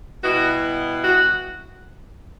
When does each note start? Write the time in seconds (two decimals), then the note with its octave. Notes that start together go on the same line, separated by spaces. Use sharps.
0.24 B2 G3 B3 E4 F#4
1.04 F#4